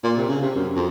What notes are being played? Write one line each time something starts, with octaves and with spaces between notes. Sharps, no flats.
A#2
C3
C#3
C3
F#2
F2